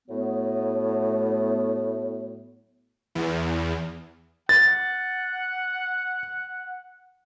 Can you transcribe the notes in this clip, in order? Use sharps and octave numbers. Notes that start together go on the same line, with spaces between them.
A2 F#3 A3 B3
E2
F#5 A6